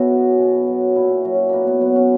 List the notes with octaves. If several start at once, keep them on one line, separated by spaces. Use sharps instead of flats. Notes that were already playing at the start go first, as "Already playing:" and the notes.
Already playing: B2 B3 C#4 E4 F#4 G#4
F#3
B2
F#3
A#2 E4
F#3
C#4
A#2 A#3 B3
B3
F#3 B3
C#4